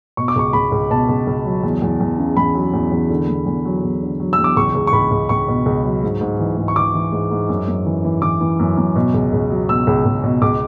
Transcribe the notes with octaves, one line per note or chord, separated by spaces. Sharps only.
B2 C#6
D6
C#2 C#6
C#2 B5
C#2
B2 A5
C#2
C#2
F#3
E2
E2
E2
C#3
E2 B5
F#3
E2
E2
D3
E2
E2
F#3
E2
D3
F#3
E6
E2
D6
C#2 C#6
C#2
C#6
C#2 B5
C#2
C#2 C#6
B2
C#2
F#3
G#2
G#2
E3
G#2
C#6
E3 D6
E3
G#2
G#2
F#2
F#2
E3
E3
E3 D6
E3
F#2
F#2
B2
C#2
C#2
F#3
B2 E6
C#2
C#2
B2
C#2 D6